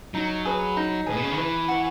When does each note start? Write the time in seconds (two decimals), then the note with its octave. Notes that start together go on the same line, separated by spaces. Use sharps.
0.14 F#3 D#4
0.45 G#4 B4
0.77 D#4
1.06 A2 G#4 B4
1.16 B2
1.23 C#3
1.31 D#3
1.37 E3 B4
1.68 F#5 C#6